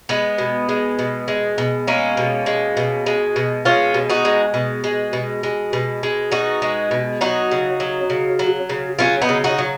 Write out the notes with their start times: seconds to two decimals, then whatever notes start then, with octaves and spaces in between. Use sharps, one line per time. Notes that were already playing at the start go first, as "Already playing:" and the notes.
0.09 G#3 B3
0.38 B2
0.69 G#3
0.99 B2
1.28 G#3
1.58 B2
1.87 G#3 A#3 C#4
2.17 B2
2.46 G#3
2.77 B2
3.06 G#3
3.36 B2
3.65 G#3 C#4 F4
3.94 B2
4.10 D#4 F#4
4.25 G#3
4.54 B2
4.84 G#3
5.13 B2
5.43 G#3
5.73 B2
6.03 G#3
6.32 B2 D#4 F#4
6.62 G#3
6.91 B2
7.21 F#3 D#4 F#4
7.51 C#3
7.80 F#3
8.10 C#3
8.39 F#3
8.69 C#3
8.99 F#3 C#4 F4
9.21 B3 D#4
9.29 C#3
9.44 D#4 F#4
9.58 F#3